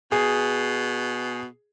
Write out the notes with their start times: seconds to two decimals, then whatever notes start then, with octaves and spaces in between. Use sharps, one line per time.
0.12 B2 G#4